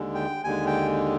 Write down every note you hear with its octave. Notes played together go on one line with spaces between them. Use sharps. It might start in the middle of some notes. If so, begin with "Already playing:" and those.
Already playing: D#2 D3 G#3
G5
D#2 D3 G#3 G#5
G5